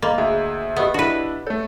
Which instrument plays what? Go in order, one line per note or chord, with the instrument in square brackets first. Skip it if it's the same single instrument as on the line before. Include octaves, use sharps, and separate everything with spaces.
[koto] A#3 [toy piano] D#5 B5 C6
[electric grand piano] D2 G#4 E5
[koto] B3 [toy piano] G4 D#5 D#6
[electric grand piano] D4 E4 [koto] F#4 B4
[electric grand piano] A3 A4 [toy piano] C#5